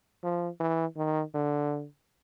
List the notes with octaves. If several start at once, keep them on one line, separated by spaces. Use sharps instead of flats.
F3
E3
D#3
D3